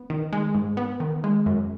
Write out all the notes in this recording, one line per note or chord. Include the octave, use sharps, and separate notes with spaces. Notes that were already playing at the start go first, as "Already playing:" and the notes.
Already playing: B3
D#3
G#3
G#2
B3
D#3
G#3
F#2